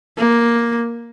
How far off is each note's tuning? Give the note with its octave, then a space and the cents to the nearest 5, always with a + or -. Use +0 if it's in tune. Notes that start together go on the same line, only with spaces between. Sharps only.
A#3 +5